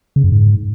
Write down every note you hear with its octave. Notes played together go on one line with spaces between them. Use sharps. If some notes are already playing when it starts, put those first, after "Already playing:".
C#3
F#2
G#2